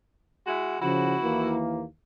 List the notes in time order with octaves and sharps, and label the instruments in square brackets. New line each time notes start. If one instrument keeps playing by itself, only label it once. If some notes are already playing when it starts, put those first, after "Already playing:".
[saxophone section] G#3 E4 F#4
[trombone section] C#3 F3 [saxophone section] E4 F#4
[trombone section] D#2 E3 A#3